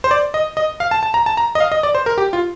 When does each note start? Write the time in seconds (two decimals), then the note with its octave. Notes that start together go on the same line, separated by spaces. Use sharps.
0.04 C5
0.11 D5
0.34 D#5
0.57 D#5
0.80 F5
0.91 A5
1.03 A5
1.14 A#5
1.26 A5
1.37 A#5
1.55 D#5
1.60 F5
1.72 D#5
1.83 D5
1.95 C5
2.06 A#4
2.18 G4
2.33 F4